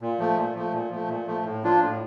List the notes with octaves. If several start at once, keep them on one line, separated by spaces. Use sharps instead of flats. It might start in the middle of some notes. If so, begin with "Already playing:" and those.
A#2
F3 A3
A#2
F3 A3
A#2
F3 A3
A#2
F3 A3
A2
F3 A#3 D4 F4
A2